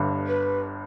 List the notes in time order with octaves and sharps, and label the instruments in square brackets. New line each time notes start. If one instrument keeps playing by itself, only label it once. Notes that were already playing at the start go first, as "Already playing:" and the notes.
Already playing: [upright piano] G1 G2 D3
[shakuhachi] B4